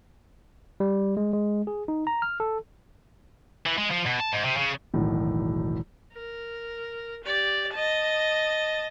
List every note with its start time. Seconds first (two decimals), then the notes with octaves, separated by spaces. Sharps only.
0.80 G3
1.17 G#3
1.33 G#3
1.67 G#4
1.88 D#4
2.07 A#5
2.22 F6
2.40 A4
3.66 E3
3.78 G#3
3.91 F3
4.06 B2
4.20 A5
4.32 G#2
4.44 C3
4.57 C#3
4.94 E1 B1 E2 A2 D#3
6.14 A#4
7.24 G4 D5
7.73 D#5 A5